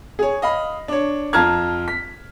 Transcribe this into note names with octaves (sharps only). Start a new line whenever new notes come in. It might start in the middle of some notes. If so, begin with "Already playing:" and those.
G#4 C#5
D#5 F5 B5
D4 C#5
F2 F4 A5 A#5 F6 G#6
B6